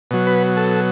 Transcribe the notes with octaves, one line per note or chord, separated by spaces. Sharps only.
B2 F#3
B4
A4